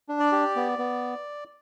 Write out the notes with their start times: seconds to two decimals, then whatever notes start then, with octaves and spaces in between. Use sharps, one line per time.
0.09 D4
0.20 D5
0.32 G4
0.56 B3
0.78 B3